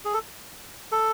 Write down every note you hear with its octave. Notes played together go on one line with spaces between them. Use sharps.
G#4
A4
A4